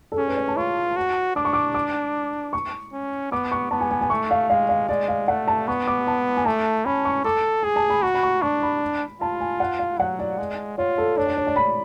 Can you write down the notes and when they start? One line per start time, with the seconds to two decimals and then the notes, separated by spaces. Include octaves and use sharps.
0.12 A4
0.17 C#4 G#4
0.28 B4
0.37 C#5
0.48 A5
0.57 F4 C#6
0.96 F#4
1.36 D4 D6
1.45 C#6
1.53 D6
1.74 D6
2.53 C#6
2.93 C#4
3.31 B3 D6
3.52 C#6
3.71 B3 A5
3.81 G#5
3.91 G#5
4.01 G#5
4.10 A3 C#6
4.31 F5
4.50 G#3 F5
4.69 F5
4.89 G#3 D5
5.08 F5
5.28 A3 F#5
5.48 A5
5.67 B3 C#6
5.87 D6
6.07 A5
6.37 G#5
6.45 A3 A5
6.85 C#4 B5
7.05 C#6
7.24 A4 D6
7.63 G#4 G#5
7.76 A5
7.90 B5
8.02 F#4 C#6
8.14 B5
8.23 C#6
8.42 D4 C#6
8.63 B5
9.21 F4 A5
9.40 G#5
9.60 F#5
9.79 F5
9.99 F#3 F#5
10.19 D5
10.38 G#3
10.78 F4 C#5
10.98 A4
11.17 D4 C#5
11.27 D5
11.37 C#5
11.47 D5
11.56 B5